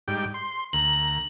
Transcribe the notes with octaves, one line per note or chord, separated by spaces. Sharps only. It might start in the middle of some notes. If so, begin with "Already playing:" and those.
G#2 G3 G5
C6
D2 A#5 F#7